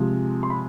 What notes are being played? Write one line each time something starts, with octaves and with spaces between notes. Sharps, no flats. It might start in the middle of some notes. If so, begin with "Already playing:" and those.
Already playing: C3 F3 G#3
C6
B5